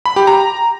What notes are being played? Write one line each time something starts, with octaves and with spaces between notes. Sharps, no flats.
B5
G4
A#5